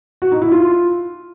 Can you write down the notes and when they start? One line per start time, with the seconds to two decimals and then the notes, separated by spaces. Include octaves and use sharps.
0.22 F#4
0.32 D#4
0.42 E4
0.52 F4